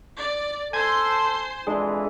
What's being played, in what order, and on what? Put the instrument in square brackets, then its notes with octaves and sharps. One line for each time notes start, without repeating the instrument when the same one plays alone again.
[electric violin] D5
[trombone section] A4 [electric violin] C5 C6 [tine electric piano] G#5 G#6
[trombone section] F2 E3 [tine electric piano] G#3 D4 G#4